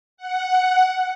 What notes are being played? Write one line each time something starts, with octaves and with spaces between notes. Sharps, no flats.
F#5